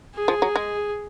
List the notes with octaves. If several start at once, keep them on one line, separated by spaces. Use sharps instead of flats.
G#4
F3
F#3
G#3